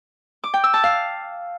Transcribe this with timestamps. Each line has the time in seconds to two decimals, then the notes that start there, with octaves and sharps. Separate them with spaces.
0.44 D6
0.54 G5
0.64 E6
0.74 A5
0.84 F5